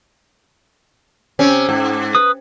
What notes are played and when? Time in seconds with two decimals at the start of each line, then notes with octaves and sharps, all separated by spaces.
1.39 C3 C4 C#4
1.69 G#2
2.15 B4 D#6